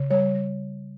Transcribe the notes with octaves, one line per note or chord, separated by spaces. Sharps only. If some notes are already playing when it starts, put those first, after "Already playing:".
Already playing: C#3
G3 C#5
G3